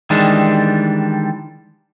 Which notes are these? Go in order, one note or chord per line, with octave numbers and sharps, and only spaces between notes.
D#3 E3 G3 G#3 D4